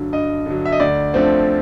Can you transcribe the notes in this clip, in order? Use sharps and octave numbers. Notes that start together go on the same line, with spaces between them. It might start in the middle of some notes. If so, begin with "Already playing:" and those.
Already playing: G2 D3 F#3
G2 D#5
D3 F#3
E5
D#5
D2 D5
D3 F3 A3 C4